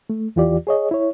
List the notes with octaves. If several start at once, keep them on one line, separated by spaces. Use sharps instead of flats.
A3
E2 E3 F4 G4 D5
G#4 C#5 D#5
E4 C#5